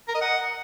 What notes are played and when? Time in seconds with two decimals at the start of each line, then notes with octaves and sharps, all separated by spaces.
0.08 A#4
0.15 D#5
0.21 F#5